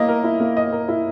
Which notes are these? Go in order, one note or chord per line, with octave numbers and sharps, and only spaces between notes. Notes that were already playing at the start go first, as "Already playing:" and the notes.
Already playing: A#3 E4 D#5
A#4
E4
A#3
D#5
A#4
E4